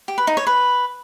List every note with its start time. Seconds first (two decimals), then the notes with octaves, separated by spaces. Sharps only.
0.08 G4
0.18 B4
0.27 D#4
0.37 C#5
0.47 B4